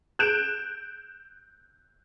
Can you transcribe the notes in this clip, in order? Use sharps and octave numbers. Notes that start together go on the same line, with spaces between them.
F#6 G6 D7 E7